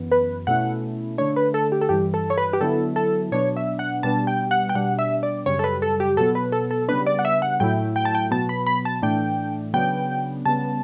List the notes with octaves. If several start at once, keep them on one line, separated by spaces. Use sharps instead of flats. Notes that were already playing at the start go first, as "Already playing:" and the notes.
Already playing: F#2 E3 B3
B4
B2 A3 C#4 E4 F#5
D3 A3 D4 C#5
B4
A4
G4
A4
G2 E3 G3 G4
A4
C#5
B4
G4
D3 F#3 B3 E4 A4
A4
B2 F#3 B3 D4 C#5
E5
F#5
B2 G3 B3 D4 A5
G5
F#5
G5
B2 G3 D4 F#5
E5
D5
F#2 C#3 G3 C#5
A4
B4
A4
G4
B2 F#3 B3 A4
B4
A4
A4
C#3 G3 B3 D4 B4
D5
F#5
E5
F#5
A2 F#3 A3 E4 G5
G5
A5
G5
B2 F#3 B3 A5
B5
B5
A5
A2 E3 A3 D4 G5
C#3 F#3 B3 D4 G5
C#3 G3 B3 A5